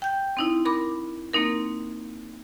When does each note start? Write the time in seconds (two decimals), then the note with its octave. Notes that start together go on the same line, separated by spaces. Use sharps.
0.02 G5 G6
0.37 C4 D#4 E4
0.65 A#4 B5 D6
1.33 A#3 C4 D#4 A#4